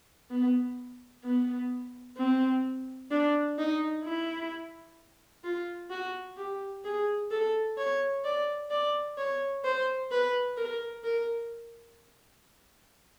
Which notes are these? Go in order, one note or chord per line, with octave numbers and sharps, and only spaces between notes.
B3
B3
C4
D4
D#4
E4
F4
F#4
G4
G#4
A4
C#5
D5
D5
C#5
C5
B4
A#4
A#4